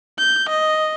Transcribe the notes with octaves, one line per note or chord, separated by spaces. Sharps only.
G6
D#5